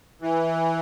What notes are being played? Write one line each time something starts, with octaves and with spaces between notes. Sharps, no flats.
E3